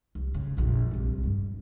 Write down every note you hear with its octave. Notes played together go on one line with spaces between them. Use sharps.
C2
C#3
A#1 F2
C2 C4
G2